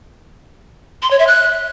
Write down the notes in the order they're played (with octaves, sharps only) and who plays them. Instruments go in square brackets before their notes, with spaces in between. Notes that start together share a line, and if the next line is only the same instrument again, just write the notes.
[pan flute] C6
C#5
E5
F#6